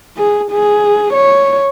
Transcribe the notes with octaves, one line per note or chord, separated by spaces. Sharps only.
G#4
G#4
C#5